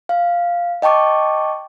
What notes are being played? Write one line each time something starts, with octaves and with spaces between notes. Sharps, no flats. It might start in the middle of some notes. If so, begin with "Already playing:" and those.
F5
D#5 G5 A5 C#6 D6